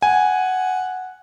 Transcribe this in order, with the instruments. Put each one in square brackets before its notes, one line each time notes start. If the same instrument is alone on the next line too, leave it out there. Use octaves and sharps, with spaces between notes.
[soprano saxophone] F#5 [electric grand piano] G#5